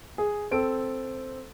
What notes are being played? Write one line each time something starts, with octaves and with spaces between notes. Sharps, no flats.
G#4
C4 A4 D7